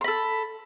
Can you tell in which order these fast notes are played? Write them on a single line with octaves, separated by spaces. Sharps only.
C6 B5 A4